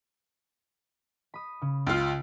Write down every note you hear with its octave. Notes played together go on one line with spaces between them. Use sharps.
B5 D#6
C#3
C#2 F4